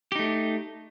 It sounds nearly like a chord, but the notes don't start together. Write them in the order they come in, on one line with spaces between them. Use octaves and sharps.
G4 D#4 A3